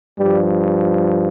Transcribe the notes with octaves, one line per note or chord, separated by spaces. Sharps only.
G2 F3 G3